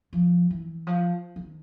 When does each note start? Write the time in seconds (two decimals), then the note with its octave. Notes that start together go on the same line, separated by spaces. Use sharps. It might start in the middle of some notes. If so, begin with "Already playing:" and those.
0.13 F3
0.50 E3
0.87 F3
1.36 D#3